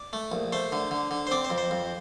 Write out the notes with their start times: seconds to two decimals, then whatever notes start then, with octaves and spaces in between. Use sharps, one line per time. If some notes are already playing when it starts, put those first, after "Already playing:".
Already playing: D5
0.13 A3
0.32 A#1
0.53 A3 C5
0.72 D3
0.91 D3
1.11 D3
1.27 C5
1.31 C4 D5
1.45 C5
1.50 F2
1.58 C5
1.71 F2